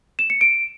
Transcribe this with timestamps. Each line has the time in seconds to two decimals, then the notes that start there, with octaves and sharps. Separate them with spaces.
0.19 E7
0.30 C#7
0.41 D7